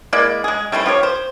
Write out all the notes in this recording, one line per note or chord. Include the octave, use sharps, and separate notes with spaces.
G#3 A#3 E4 D5
G#3 G#4
G3 A3 C4 E4
F3 G4 C#5
C5